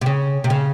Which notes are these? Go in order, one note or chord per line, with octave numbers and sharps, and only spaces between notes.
C3
C#3
C3
C#3